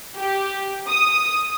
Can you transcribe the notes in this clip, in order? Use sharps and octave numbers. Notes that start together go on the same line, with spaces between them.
G4
D#6